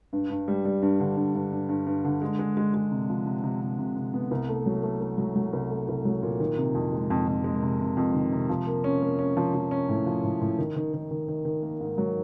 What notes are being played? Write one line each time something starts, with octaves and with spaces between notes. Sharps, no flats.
G2
G2
G3
G3
G2
D3
G2
G2
G2
G2
G2
D3
G#3
G#3
G#3
G#3
C3
F3
C3
C3
C3
C3
C3
B3
C2
A3
F#3
A3
A3
F#3
F#3
C2
A3
C2
F#3
A#2
D#3
C3
F2
G#3
F2
F2
G#3
C3
C3
F2
D#3
C3
F3
A#3
C#4
A#3
C#4
F3
F3
C#4
A2
F3
A2
A2
D#3
D#3
D#3
D#3
D#3
D#3
A#3
G#2
F#3